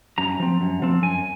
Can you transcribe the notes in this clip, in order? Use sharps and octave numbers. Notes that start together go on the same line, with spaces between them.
F#2 A#5
F3 C4
F#2
F3 C4
F#2 G#5